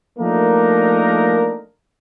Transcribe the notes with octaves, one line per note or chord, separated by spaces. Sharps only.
F3 A3 A#3 D4 D#4 A#4